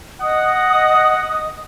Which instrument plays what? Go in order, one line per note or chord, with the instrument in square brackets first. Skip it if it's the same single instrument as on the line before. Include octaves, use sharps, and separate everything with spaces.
[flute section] D#5 D#6 [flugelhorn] F#5